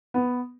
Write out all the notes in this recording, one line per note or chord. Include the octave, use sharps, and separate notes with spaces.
B3